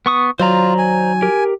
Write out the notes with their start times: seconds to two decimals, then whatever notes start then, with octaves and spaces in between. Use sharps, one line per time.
0.06 B3 C#6 D#6
0.40 D#3 F#3 F4 C5 D5 A#5
0.78 G#5
1.22 G4 A#4